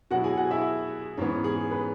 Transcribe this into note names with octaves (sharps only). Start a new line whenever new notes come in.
B2 F#3 E4 F#4 F#5
G#4 G#5
F#4 F#5
E4 E5
G#2 E3 B3 C#4 C#5
G#4
B4